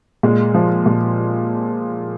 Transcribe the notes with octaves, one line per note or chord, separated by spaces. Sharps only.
A#2 G#3
F3
A#2